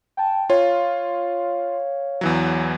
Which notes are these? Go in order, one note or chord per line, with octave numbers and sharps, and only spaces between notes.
G5 A5
F4 C#5 F5
E2 E3 F#3